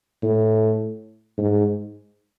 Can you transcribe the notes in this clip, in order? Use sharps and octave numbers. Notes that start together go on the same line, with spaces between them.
A2
G#2